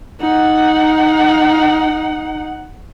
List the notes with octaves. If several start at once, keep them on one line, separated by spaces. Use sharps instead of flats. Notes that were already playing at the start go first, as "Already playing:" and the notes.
D#4 F#5